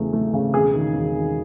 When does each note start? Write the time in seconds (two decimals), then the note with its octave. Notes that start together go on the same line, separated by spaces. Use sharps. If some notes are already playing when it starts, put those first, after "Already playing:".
Already playing: E2 C#3 A3
0.13 A3
0.33 C#3
0.54 E1 G#4
0.74 D#3
0.94 E1
1.14 D#3